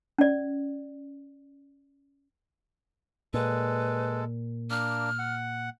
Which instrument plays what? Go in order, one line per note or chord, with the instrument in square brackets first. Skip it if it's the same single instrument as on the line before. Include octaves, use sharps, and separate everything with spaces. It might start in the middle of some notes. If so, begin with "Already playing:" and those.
[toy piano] C#4 D5
[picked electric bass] A#2 [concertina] G#3 A4 [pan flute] B4
[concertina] A#3 D4 [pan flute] F6
[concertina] F#5